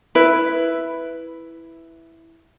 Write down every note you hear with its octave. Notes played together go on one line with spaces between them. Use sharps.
E4 B4